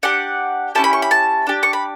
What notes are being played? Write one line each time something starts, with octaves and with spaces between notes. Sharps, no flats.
D4 G4 F#5
C#4 E4 G4 A5
B5
C#6
B5
A5
D4 G4
C#6
B5